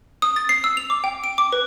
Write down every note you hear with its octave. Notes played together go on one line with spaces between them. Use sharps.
D#6
A6
C7
E6
F7
D6
G5
D7
D6
B4